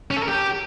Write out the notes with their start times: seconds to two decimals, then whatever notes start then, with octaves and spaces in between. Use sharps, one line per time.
0.11 C#4
0.17 A4
0.23 A#4
0.28 G4